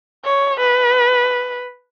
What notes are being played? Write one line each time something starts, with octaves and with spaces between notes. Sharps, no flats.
C#5
B4